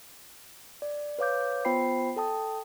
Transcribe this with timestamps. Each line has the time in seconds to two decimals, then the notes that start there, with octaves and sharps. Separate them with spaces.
0.82 D5
1.19 B4 C#5 F5 D6 G6
1.65 B3 F4 C5 G5 B5 C7
2.16 A4 G5 A5 D#6